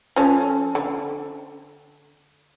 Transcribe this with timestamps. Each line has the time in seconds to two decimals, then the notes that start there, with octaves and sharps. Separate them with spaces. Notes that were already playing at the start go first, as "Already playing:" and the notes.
0.16 F3 C#4 A4
0.75 D3